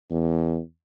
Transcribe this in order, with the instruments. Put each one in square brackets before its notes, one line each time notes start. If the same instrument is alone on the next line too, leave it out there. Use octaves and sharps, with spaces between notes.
[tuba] E2